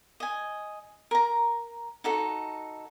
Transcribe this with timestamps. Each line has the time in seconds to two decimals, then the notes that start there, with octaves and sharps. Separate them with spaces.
0.20 D#5 G#5
1.11 A#4 A#5
2.04 D#4 F#4 A4